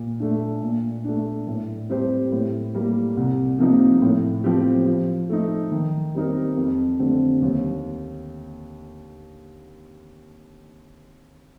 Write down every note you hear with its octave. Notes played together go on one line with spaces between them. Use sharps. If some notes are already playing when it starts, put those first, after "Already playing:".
Already playing: A#2
A3 D4
A#2
A3 D4
A2
G3 C4 G4 C5
A2
G3 A#3
C2
C3 F3 A#3 D#4
A2
F3 C4 G4
F3
A3 D#4
D#3
G3 C4 D#4 A#4
F2
D3 A3 C4 G4
D#2